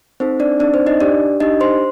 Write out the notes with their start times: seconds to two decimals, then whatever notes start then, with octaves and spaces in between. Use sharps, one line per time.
0.20 C4 D#4 A4 C5
0.40 D4 D5
0.60 C4 D4 D#4 A4 D5
0.74 C5
0.87 D#4 D#5
1.00 D4 G4 D5
1.40 D4 D#4 G4 D#5
1.61 C5 C6